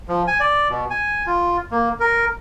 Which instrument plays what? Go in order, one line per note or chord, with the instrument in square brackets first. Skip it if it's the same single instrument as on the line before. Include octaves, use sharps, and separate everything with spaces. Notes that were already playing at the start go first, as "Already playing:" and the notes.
[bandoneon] F3
G#5
D5
B2
G#5
F4
A#3
A#4